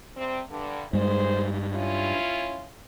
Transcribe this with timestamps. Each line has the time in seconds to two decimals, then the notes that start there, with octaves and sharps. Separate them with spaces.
0.17 C3 G3 C4
0.49 G2 D3
0.93 G2 A#2 G#3 G#4 C5
1.74 C#4 E4 F4